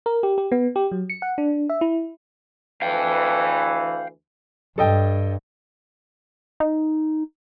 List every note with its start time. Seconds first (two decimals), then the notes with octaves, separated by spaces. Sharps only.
0.06 A#4
0.23 G4
0.38 G4
0.52 B3
0.76 G4
0.92 F#3
1.10 C#7
1.22 F#5
1.38 D4
1.69 E5
1.81 E4
2.82 D2 E3 F5 G5
4.78 G2 A4 D#5 G5
6.60 D#4